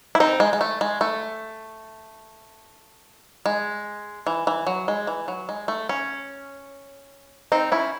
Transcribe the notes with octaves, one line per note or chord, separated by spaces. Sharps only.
E4
C4 D#4
G#3
G#3
A3
G#3
A3
G#3
E3
E3
F#3
G#3
E3
F#3
G#3
A3
C#4
C4 D#4
C#4 E4